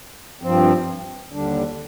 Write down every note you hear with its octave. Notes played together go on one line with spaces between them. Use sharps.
G2 F3 C4
D#2 D3 G3 D4